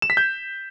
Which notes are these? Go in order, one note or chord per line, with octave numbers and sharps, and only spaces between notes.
E7
B6
G6